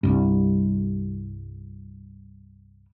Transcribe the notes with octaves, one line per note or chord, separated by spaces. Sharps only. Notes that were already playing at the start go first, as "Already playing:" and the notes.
C2 G2